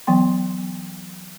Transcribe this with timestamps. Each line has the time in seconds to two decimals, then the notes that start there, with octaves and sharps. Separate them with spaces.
0.07 E3 F#3 B3 G5 C6